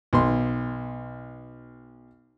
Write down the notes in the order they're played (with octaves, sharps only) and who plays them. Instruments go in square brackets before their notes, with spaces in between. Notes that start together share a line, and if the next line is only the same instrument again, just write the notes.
[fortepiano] B1 C6